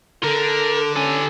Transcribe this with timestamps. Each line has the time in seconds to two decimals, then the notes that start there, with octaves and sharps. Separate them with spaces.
0.23 D3 A4 A#4
0.96 C#4 A4 G#5